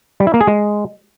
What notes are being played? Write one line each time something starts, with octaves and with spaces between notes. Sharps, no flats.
G3
E4
A#3
G#4
G#3